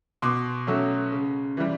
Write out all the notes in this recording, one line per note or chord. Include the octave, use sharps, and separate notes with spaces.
B2 C6 D6
F#3 A3 C#4
C#3
E3 G3